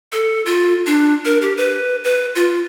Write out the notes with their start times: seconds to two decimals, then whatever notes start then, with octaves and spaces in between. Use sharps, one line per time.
0.12 A4
0.46 F4
0.86 D4
1.25 A#4
1.42 G4
1.57 B4
2.04 B4
2.35 F4